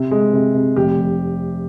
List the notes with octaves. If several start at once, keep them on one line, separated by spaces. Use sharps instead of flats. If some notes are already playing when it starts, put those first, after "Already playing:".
Already playing: C3
G#3
C3
C3
F1 G4
F1